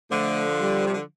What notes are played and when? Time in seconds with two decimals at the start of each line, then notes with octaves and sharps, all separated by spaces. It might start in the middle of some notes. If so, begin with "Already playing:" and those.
0.10 D3 F3 A3
0.60 G3
0.86 C3
0.94 D3